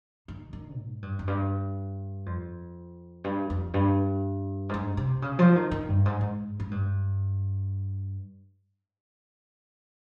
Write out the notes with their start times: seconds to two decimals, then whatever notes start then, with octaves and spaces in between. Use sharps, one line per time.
0.28 D#3
0.53 D#3
0.77 G#2
1.02 G2
1.19 F2
1.27 G2
2.26 F2
3.24 G2
3.50 F2
3.74 G2
4.69 G#2
4.74 G2
4.97 C3
5.22 C#3
5.39 F3
5.56 D#3
5.71 D#3
5.89 G2
6.06 G#2
6.21 G#2
6.60 G#2
6.71 G2